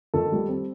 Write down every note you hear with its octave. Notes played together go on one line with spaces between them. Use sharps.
D#3 A4
G3
C4